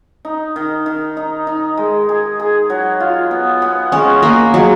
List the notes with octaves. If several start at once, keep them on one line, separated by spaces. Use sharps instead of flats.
D#4
D#3
D#3
D#4
D#4
G#3
G#4
G#4
F#3
F4
B3
B3
G#3 C#4
A#3 F#4
F#3 G#3